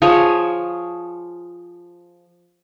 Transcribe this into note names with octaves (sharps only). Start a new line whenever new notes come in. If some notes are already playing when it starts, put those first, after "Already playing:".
F3 G#4 C#5